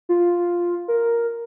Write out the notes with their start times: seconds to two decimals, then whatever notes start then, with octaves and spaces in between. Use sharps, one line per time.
0.09 F4
0.88 A#4